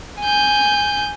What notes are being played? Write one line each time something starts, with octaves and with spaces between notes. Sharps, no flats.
G#5 G6